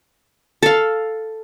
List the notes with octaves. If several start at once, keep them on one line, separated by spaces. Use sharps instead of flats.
A4 F5